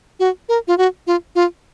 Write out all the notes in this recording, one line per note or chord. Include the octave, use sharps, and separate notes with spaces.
F#4
A#4
F4
F#4
F4
F4